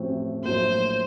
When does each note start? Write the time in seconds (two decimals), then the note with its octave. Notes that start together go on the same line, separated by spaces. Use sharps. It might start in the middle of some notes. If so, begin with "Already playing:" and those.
Already playing: A1 A2 F3 C4 F#4
0.45 A#1 A2 F#3 A#3 F4 C5